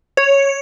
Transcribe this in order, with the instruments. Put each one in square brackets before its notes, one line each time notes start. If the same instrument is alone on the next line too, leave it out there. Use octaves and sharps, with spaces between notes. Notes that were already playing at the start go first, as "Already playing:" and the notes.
[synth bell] C#5